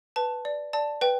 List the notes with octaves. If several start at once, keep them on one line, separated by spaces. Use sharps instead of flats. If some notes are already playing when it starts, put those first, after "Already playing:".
B4 A5
D5
D5 A5
B4 G5